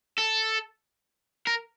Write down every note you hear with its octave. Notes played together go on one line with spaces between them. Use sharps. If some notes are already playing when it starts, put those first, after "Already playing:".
A4
A#4